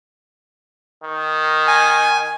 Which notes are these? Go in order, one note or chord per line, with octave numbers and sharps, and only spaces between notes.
D#3
G#5